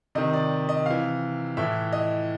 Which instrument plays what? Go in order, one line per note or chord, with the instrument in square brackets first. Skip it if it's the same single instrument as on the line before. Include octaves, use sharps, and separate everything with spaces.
[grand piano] C3 D#3 D#5
D5
D#5
C3 E3 F5
A2 E3 E5
D#5